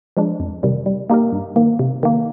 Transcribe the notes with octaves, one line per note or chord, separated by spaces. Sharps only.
F3 G#3 D4
F2
C3 D#3 G3
G3
A#3 D#4 G4 A#4
G2
D#3 A#3
C3
D#3 A#3